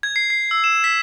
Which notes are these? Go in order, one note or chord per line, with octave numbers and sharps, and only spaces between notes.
G#6
C7
C7
E6
E7
B6